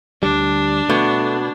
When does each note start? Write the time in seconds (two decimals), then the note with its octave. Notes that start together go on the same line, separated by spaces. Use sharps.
0.23 D2 G3 D4
0.90 B2 A3